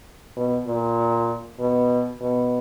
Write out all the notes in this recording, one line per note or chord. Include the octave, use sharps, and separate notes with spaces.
B2
A#2
B2
B2